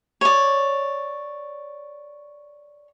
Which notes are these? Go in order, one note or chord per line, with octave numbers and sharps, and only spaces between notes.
C#5 D5